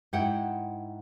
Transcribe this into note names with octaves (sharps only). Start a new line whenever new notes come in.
G#2 E4 F#5 G5